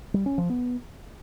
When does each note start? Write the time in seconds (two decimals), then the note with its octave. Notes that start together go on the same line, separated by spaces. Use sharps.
0.14 G3
0.26 C#4
0.38 F3
0.50 B3